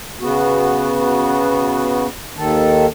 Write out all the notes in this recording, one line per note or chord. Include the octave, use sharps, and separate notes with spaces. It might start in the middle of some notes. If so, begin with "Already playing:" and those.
C#3 B3 F#4
D#2 D#3 A4